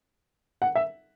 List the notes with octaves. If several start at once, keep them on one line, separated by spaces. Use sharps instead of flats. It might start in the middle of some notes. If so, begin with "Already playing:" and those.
F#5
E5